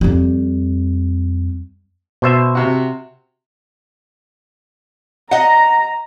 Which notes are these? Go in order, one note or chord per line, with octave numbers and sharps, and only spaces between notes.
F2 G3
B2 C5 E5
C3 F#4
D#5 F#5 A#5